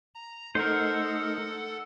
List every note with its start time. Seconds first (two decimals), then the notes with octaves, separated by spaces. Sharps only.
0.15 A#5
0.55 A3 D#4 A4 A#4 C5 F#5